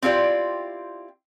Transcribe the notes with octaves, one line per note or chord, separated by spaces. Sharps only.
C4 E4 F4 G4 D5